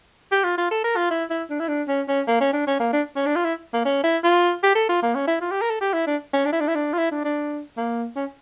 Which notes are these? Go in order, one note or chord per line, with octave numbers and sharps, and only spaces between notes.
G4
F4
F4
A4
A#4
F4
E4
E4
D4
E4
D4
C#4
C#4
A#3
C#4
D4
C#4
A#3
D4
C#4
D4
F4
E4
A#3
C#4
E4
F4
G4
A4
F4
A#3
C#4
E4
F4
G4
A#4
A4
G4
E4
D4
C#4
D4
E4
D4
E4
D4
F4
E4
D4
D4
A#3
C#4